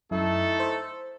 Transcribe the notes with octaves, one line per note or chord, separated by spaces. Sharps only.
F#2 A3 D#4 E4 A4
C5